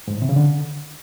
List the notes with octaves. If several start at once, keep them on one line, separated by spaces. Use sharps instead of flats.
G#2
A2
C3
C#3
D3